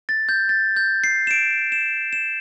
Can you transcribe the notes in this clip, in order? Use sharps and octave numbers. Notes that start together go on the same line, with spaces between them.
A6
G6
A6
G6
C7
E7
D7
E7
E7